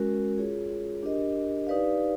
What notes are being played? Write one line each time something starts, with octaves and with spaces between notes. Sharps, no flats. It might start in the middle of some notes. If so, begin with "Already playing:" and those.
Already playing: G#3 C#4 F#4 A#4
F4 G#4 C#5
D4 G4 A#4 D#5
D#4 G4 B4 D5 F5